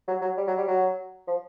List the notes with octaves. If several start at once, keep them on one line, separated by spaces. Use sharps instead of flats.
F#3
F#3
G3
F#3
G3
F#3
F3